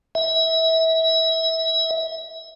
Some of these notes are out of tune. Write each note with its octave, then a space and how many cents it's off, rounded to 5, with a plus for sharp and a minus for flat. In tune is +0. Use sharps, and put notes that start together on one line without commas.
E5 -25